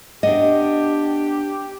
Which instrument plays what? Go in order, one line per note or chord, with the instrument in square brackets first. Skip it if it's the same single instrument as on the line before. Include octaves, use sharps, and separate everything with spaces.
[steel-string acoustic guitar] B3 D4 [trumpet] G4 [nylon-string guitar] D#5